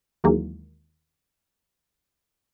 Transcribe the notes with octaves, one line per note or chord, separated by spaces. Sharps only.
D#2 D#3 E3 F#3 G#3 A#3